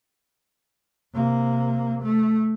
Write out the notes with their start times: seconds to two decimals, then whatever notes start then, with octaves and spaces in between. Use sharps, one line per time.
1.13 C3 A#3
2.02 A3